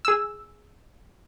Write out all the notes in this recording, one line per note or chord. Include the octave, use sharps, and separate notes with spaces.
G#4 E6